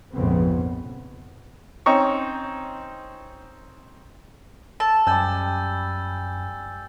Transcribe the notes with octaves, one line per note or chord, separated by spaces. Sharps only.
A#1 F2 G#2 C#3 B3 C4
C4 C#4 D#4 C#6
A5 E6
F#2 G3 G#5 E6 G6 A6